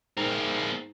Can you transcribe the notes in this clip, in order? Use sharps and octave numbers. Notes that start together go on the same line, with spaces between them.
G#2 C4 A#4